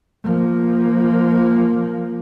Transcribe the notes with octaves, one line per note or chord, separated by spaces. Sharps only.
F3 A#3